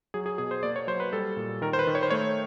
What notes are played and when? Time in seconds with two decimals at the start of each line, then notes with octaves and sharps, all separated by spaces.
0.14 F#3 G#4
0.26 G#4
0.38 B2 G#4
0.51 C5
0.63 A#3 D5
0.76 C#5
0.87 F#3 C5
1.00 B4
1.13 G3 A4
1.37 A#2
1.62 D#3 A#4
1.73 C5
1.79 B4
1.87 D#3
1.95 C#5
2.03 C5
2.10 A3 C#5